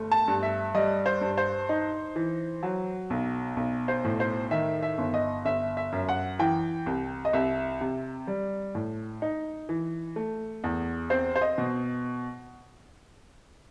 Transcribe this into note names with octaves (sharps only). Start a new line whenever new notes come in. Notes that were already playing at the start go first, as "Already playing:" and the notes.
Already playing: G1 A3
A5
G2
E5
G3 D#5
C5
G2
C5
D#4
E3
F#3
B1
B1
C5
A2
C5
D#3 E5
E5
G1
D#5
G1 E5
E5
F#2
F#5
E3 G5
C2
D#5
C2 E5
C3
G3
A2
D#4
E3
A3
E2
C4 C5
C5
D#5
B2